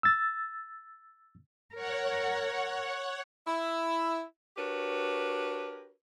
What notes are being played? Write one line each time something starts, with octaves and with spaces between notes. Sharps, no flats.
E6 A6
A#4 C#5 F#5
E4 E5
D4 F#4 G4 A#4 B4 C#5